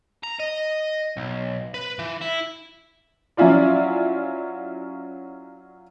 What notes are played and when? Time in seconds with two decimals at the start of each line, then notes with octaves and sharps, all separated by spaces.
0.23 A#5
0.40 D#5
1.17 B1
1.74 B4
1.99 E3
2.21 E4
3.37 F#3 C#4 E4 F4 D5